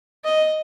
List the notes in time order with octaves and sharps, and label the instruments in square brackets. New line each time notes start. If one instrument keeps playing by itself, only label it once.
[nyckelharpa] D#5